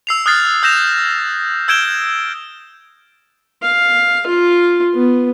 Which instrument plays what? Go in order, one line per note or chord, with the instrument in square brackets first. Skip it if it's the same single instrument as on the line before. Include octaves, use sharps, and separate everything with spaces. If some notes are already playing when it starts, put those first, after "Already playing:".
[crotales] E6 C7 F7
D#6 F6 F#6 G#6 A6 C7
E6 G6 A#6 E7 F7
E6 G6 G#6 D7 E7 G7
[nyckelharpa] F5
F4
B3